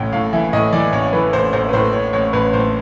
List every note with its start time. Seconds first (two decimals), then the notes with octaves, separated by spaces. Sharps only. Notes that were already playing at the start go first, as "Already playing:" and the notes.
Already playing: A1 A2 G5
0.12 A2 F5
0.33 E3 E5
0.53 A2 D#5
0.73 E3 D5
0.92 A1 C#5
1.13 E3 B4
1.33 A1 C5
1.53 A1 C5
1.69 B4
1.73 A2 C5
1.93 A1 C#5
2.13 A1 C#5
2.33 A1 B4
2.53 A2 C5